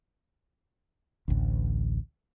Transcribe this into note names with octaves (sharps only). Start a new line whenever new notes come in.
A1 D2